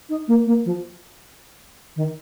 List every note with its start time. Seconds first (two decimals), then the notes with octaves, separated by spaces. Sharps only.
0.09 D#4
0.28 A#3
0.46 A#3
0.65 F3
1.96 D#3